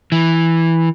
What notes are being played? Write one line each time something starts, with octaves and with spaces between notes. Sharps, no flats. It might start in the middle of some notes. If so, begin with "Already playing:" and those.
E3